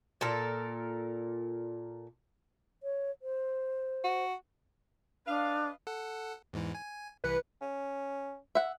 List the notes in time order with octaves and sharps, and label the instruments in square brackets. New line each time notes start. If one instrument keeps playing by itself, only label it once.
[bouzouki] A#2 A4 A#4
[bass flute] C#5
C5
[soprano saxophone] F#4
[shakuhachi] D4 [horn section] B4 D#5 F5
[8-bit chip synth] A4 F#5
E2 G#2 E3
G#5
[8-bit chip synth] C2 E3 C#7 [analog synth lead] B4
[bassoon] C#4
[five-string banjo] E5 F#5